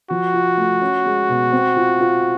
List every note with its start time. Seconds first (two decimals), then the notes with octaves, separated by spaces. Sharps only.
0.10 F3 F#4
0.34 F4
0.57 A3
0.81 C#4
1.05 G#3
1.29 B2
1.52 C4
1.76 F4
2.00 F4